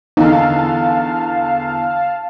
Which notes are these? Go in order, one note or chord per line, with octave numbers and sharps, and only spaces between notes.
E2 D3 D#4 F5 A5